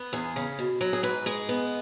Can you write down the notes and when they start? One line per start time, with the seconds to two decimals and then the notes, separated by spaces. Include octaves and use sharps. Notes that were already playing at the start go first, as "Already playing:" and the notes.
Already playing: B3
0.13 E2 G#4
0.36 C#3
0.59 B2
0.81 F#3
0.93 G#4
1.03 G#2 B4
1.26 G#3 G#4
1.49 B3